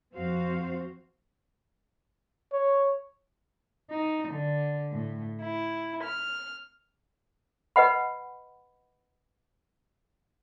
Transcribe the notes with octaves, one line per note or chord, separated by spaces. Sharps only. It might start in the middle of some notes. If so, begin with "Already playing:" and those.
F2 F3 C4 F#4 C5 F5
C#5
D#4
D3
A2
E4
F6
B4 D#5 F#5 B5